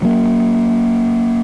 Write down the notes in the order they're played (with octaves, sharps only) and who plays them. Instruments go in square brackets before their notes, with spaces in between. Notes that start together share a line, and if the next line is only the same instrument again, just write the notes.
[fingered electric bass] F#3 A#3